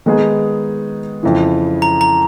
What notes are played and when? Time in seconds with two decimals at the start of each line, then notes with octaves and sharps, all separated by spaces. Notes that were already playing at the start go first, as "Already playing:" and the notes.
0.06 D#3 G#3 B3 D#4 G#4
1.23 F2 C#3 E3
1.82 A#5
2.01 A#5